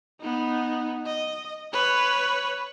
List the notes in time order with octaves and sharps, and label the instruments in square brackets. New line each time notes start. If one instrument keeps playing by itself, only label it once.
[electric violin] B3 D#4
D#5
B4 C#5